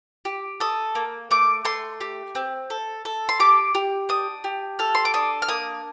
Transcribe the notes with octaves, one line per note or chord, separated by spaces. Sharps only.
G4
A4 D#6
A#3
A3 D6
A3 C6
G4
C4
A4
A4
C6
G4 D6
G4
D4 D#6
G4
A4 F6
C6
D6
D4 D#6
F6
A#3 D#6